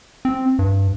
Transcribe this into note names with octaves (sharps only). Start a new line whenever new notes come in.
C4
G2